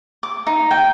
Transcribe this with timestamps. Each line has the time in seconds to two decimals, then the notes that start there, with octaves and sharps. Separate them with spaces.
0.23 D6
0.47 D#4
0.71 G5